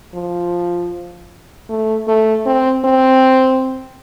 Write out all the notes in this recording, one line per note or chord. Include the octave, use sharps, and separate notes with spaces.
F3
A3
A3
C4
C4